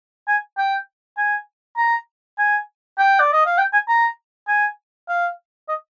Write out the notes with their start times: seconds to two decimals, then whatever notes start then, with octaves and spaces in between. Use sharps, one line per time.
0.28 G#5
0.57 G5
1.17 G#5
1.77 A#5
2.38 G#5
2.99 G5
3.20 D5
3.33 D#5
3.46 F5
3.58 G5
3.73 G#5
3.89 A#5
4.48 G#5
5.09 F5
5.69 D#5